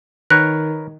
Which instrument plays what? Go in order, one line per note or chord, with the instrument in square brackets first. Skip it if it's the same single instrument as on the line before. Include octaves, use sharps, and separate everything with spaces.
[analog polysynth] D#3 [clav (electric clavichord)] A#4 B4 C#5 [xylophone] F#6